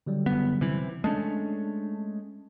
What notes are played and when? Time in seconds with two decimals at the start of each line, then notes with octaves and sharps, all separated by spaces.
0.06 D3 F#3 G3
0.26 F#1 B3
0.61 C3 E3
1.04 G#3 A3 C#4 D4 A5